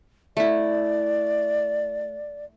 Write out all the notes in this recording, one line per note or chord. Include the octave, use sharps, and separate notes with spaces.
A3 E4 D5